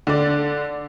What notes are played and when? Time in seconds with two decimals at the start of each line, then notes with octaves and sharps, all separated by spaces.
0.07 D3 D5